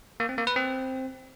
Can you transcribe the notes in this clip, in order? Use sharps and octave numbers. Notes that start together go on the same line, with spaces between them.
A#3
C4
A#3
B4
C4